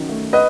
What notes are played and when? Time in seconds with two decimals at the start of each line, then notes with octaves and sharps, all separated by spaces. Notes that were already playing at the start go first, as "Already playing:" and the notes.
Already playing: D#3 F#3 C#4
0.09 A3
0.33 B4 D#5